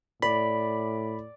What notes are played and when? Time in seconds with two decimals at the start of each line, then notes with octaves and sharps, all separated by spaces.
0.22 A2 D5 B5